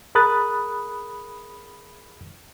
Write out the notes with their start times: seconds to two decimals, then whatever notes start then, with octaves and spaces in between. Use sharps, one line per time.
0.15 G#4 A#4 B5 D#6 F#6 A6